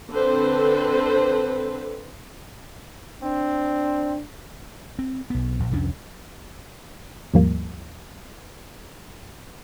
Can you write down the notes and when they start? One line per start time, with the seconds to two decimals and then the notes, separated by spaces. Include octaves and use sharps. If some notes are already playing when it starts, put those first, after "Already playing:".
0.11 D3 C4 A4 B4 C5
3.23 C4 D4
4.99 C4
5.30 B1 B3
5.60 A#1
5.71 C2 F2 C#4 D4
7.34 D#2 G#2 F3 G3 A#3